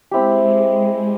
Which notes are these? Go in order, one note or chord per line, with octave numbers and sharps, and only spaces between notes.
G#3 C4 E4 G4